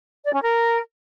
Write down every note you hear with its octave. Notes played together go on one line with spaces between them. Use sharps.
D5
C#4
A#4